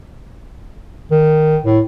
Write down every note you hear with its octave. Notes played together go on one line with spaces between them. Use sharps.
D#3
A2